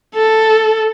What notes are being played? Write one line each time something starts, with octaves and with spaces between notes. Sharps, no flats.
A4